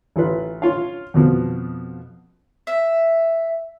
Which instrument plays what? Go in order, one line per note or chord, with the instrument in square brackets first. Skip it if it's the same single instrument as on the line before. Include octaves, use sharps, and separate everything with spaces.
[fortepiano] A1 F4 B4
F4 C#5 F5
F2 B2 F3 B3
[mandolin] E5